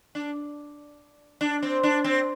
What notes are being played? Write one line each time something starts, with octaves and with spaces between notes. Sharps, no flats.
D4
D4
C4
D4
C4